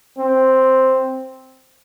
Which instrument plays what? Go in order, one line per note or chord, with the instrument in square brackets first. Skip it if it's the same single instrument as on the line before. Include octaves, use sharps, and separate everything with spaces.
[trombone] C4